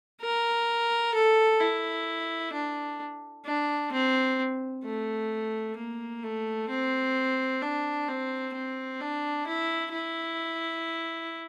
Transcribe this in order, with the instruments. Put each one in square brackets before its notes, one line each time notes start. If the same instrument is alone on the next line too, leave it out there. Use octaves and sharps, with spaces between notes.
[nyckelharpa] A#4
A4
E4
D4
D4
C4
A3
A#3
A3
C4
D4
C4
C4
D4
E4
E4